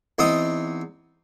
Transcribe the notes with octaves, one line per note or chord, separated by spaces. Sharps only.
E2 C4 D#4 D#6